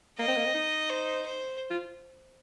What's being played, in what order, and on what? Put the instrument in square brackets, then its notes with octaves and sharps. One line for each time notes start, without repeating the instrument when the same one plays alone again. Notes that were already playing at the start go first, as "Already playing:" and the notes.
[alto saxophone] A#3 [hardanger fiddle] D#5
[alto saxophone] C4
A#3
C4
D#4
[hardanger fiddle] C5
C5
[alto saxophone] F4